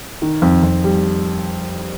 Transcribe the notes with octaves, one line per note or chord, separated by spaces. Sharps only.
D#3
F2
F2
G3